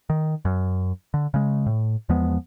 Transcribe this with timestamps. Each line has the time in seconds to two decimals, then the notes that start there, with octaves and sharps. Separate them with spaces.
0.10 D#3
0.45 F#2
1.14 D3
1.34 C#3 G#3
1.66 A2
2.09 E2 F3 G#3 B3